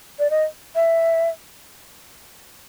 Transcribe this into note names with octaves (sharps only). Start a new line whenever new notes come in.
D5
D#5
E5